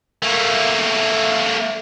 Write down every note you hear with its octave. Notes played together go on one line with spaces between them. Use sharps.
A3 A#3